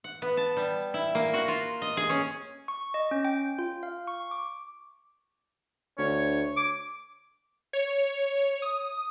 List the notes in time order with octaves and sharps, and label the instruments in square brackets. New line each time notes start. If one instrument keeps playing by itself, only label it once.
[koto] F#5
B3
A5
G3
E4
A#3
F#4
F4
D#5
G#4
C#4
[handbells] C#6
D#5
C#4
G5
F4
F5
C#6
D6
[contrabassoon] D2 [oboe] C#5
[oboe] D6
[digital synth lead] C#5
D#6